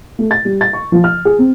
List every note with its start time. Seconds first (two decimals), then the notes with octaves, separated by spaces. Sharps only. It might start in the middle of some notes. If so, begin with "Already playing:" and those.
0.19 A3
0.31 A6
0.45 G3
0.61 A6
0.73 C#6
0.92 F3
1.04 F6
1.25 G#4
1.39 C4